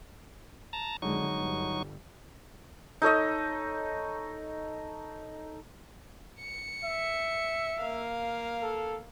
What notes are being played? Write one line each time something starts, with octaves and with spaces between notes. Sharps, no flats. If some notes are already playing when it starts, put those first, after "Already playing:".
A5 A#5
F2 D3 F#3 G#3 D#4 C#6
G1 G2
D#4 A4 C#5 D#5
C#7
E5
A#3 F5
A4